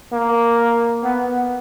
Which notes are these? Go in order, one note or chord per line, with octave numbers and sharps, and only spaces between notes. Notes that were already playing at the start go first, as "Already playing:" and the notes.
A#3
B3